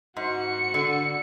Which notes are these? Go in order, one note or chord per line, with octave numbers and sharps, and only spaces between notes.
G#2 F#4 C#7
D3